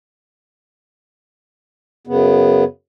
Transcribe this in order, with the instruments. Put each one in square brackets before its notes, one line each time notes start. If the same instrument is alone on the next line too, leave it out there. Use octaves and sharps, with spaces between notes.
[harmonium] F#2 C#3 B3